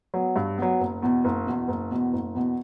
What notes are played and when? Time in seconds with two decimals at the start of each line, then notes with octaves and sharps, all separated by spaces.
0.14 F#3 B3
0.36 G2
0.58 F#3 B3
0.80 F#1
1.03 E2 B2
1.24 F#1
1.46 E2 B2
1.68 F#1
1.91 E2 B2
2.13 F#1
2.35 E2 B2